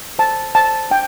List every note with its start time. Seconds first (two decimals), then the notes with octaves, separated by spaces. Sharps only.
0.19 C5 A5
0.55 C5 A5
0.91 D4 G5